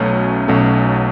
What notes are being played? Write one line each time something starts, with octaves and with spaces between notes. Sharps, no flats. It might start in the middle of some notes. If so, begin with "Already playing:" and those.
Already playing: B1 B2 F#3 A3 C#4
B1 B2 F#3 A3 C#4